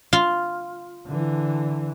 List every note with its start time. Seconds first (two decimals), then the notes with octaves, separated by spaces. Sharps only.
0.13 F4
1.06 D3 E3